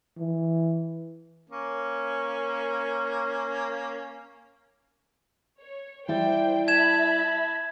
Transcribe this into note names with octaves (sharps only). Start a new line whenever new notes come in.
E3
A#3 C#4
C#5
G3 E4 C5 D5 G5
E5 A5 B5 G#6 E7